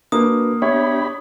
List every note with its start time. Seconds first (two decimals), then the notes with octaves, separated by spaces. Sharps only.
0.12 A#3 D4 F#4 B4 D#6
0.62 B3 D4 G4 C#5 E5 B5 G#6